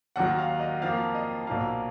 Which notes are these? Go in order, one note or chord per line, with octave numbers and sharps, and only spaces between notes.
D#2 D#3 F#3 F#5
F5
D#5
F2 F3 A#3 F5
D#5
B1 A#2 F3 A#3 F5